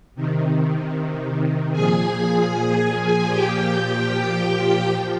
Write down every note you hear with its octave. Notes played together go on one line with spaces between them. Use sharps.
C3 D#3
A#2 F3 G#4 G#5
A#2 F3 G4 G5
G4 G5
G4 G5
F3